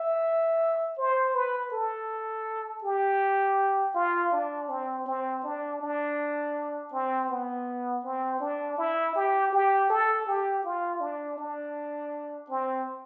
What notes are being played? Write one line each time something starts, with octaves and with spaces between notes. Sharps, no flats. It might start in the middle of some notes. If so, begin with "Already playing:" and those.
Already playing: E5
C5
B4
A4
G4
F4
D4
C4
C4
D4
D4
C4
B3
C4
D4
E4
G4
G4
A4
G4
F4
D4
D4
C4